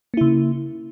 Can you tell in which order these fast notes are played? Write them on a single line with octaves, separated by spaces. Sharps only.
A#3 E4 C#3